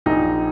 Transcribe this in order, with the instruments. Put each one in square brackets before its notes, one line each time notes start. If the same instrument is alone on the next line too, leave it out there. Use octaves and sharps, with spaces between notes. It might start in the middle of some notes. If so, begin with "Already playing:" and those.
[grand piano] A#1 A#2 D#4